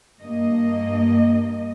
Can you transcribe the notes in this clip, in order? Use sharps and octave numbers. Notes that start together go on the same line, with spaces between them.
G2 A#3 D#5